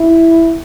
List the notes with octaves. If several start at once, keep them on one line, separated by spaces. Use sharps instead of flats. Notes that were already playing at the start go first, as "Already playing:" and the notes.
Already playing: E4